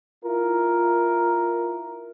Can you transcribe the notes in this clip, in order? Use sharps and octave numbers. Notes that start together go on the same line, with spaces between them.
E4 F4 A#4